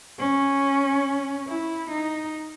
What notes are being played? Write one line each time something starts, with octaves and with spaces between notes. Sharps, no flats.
C#4
E4
D#4